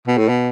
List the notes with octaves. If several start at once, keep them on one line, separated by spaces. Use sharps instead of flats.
B2
A2
B2